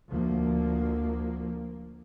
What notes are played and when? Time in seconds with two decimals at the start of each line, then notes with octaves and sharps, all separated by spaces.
0.10 D2 F3 A#3